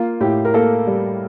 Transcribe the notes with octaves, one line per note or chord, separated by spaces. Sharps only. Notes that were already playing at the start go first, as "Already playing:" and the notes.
Already playing: A#3 F4
A2 G4
A#4
A#3 A4
G3